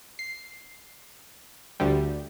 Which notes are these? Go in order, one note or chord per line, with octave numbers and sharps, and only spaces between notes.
C7
D2 D3 G3